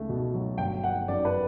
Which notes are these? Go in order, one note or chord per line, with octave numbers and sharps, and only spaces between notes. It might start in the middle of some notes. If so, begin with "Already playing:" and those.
Already playing: C#2 A3
B2
F#3
G1 G5
G1 F#5
F#2 D5
B4